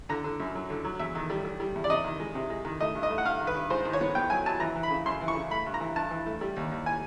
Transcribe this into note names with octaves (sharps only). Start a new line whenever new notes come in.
D3 A#5
D3
F#2
F#3
D3
F#3
E2 E5
D#3
G3
G3
G3
E2
D5
C3 D#5
D#3
G#3
C3
G#3
D#3
A3 D#5
G2
D#5
A3
F#5
G2 F5
D#3
B4
G2
G#2 C5
D#3
C#5
B3
B3 G5
F#3 G#5
F#3 A5
E3 A#5
E3
B5
C#3
F#2 C6
E3
C#6
C#3
A3 B5
G2
A#5
E3
G2 A5
E3
A3
G3
D#2
D#2
G#5